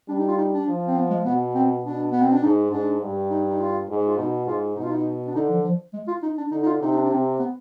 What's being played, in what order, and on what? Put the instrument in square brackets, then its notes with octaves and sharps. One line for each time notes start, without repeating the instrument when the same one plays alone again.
[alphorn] G3 [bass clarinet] D4
[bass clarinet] D#4
F4
D#4
D4
[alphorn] F3
[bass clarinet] C4
B3
G#3
[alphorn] B2 [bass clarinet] B3
[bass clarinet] C4
[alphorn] B2 [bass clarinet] D4
[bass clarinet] B3
C4
D4
[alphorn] G#2 [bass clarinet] D#4
[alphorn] G#2 [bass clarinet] D4
[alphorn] G2
[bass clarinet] D#4
D#4
F4
[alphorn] G#2
[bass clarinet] F4
[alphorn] B2 [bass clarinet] D#4
[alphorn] G#2 [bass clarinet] F4
[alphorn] B2 [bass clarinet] D#4
[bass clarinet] F4
D#4
D4
[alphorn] D3 [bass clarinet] D#4
[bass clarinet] F3
F3
G#3
F4
D#4
D4
[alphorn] D3 [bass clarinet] D#4
[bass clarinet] D#4
F4
[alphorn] C3 [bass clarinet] D#4
[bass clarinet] D#4
D4
D4
[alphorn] C3 [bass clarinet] C4
[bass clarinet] B3